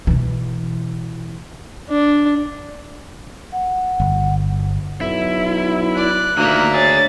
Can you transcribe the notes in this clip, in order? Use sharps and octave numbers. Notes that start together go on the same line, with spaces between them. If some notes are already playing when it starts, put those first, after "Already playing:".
B2 E3
D4
F#5
G1
B1 E4
D5 F#6
D2 A#2 D#3 A#3 E5
G#4 C#5 A6